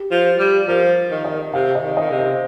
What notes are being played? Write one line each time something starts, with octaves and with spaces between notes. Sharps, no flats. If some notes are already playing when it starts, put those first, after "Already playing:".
Already playing: G4
F3
G3
F3 A#4
D#3
D#5
C3 F5
D#5
D#3
D#3 D#5
C3
C5